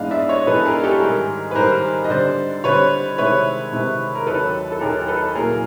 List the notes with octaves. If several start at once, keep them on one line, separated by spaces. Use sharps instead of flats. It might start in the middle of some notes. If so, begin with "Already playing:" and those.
Already playing: G#2 E3 G#3 B3 D4 D#5 F5
D5 E5
C#5 D#5
G#2 E3 G#3 B3 D4 A4 B4
G#4 A#4
G4 A4
G#2 D#3 G3 G#4 A#4
B4
G#2 D#3 G3 A#4 C5
D#5
D3 G3 C4 C5 D5
D3 G3 C4 B4 C#5
C3 D#3 G#3 C4 E4 B4 C#5
C3 D#3 G#3 C4 E4
A#4
D#2 D#3 F#3 A4 B4
A4
D#2 D#3 F#3 G#4 A#4
A4 B4
C2 A#2 F#3 A#3 C#4 G#4 A#4